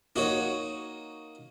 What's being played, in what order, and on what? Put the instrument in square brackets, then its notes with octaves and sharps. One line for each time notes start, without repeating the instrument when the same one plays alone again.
[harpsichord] A#3 D#4 F#4 C#5